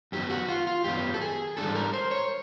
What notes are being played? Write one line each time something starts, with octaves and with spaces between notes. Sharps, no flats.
F#2 D#3 F#3 B3 G4
F#4
F4
F4
F#2 D#3 F#3 B3 G4
A4
G#4
G#2 E3 G3 B3 D4 A4
A#4
C5
C#5